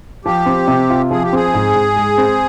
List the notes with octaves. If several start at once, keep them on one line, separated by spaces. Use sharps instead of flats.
F3 G4
C4
C3
F4
F3 G#4
G4
C4 G#4
G#2
G#2
G#3
C4